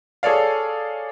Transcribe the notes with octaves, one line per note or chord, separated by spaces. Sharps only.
G#4 A4 C#5 D5 F5